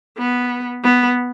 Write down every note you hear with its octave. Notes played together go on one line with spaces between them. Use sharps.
B3
B3